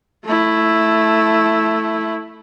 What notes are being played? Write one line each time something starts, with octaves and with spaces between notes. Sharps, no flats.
A3 E4